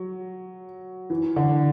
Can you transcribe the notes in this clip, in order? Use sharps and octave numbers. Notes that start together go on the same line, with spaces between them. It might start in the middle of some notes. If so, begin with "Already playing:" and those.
Already playing: F#3
E3
D3